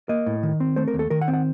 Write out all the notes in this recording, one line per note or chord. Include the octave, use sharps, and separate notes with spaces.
A#3 D#5
A2
D#3
C4
A3 C5
A#4
D#2
A4
D#3 A#4
F#5
C4
F#5